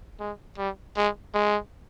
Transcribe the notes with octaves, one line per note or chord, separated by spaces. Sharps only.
G#3
G3
G#3
G#3